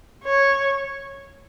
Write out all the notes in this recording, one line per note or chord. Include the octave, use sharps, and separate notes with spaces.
C#5